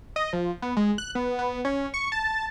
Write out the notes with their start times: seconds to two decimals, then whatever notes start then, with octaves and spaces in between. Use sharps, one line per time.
0.16 D#5
0.33 F3
0.62 B3
0.77 G#3
0.98 F#6
1.15 B3
1.39 B3
1.65 C#4
1.94 C#6
2.12 A5